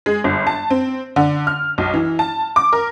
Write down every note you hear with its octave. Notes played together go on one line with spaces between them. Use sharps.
G#3
G1
A5
C4
D3
F6
B1
E3
A5
D6
A#4